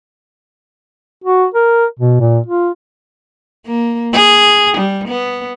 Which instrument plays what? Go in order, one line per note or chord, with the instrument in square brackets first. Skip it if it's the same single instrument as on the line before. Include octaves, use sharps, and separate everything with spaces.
[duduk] F#4
A#4
B2
A#2
F4
[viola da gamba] A#3
G#4
G3
B3